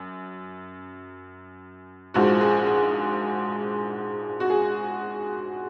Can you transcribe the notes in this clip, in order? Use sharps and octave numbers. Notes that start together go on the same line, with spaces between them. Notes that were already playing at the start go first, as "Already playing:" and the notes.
Already playing: F#2
A#1 G#2 F3 F#4
G#4
G#4
F#4
G#4